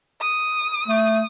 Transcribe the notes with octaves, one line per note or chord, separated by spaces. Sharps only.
D#6
A3